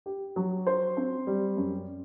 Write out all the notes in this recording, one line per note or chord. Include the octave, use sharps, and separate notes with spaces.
G4
F#3
C5
C4
G3
F#2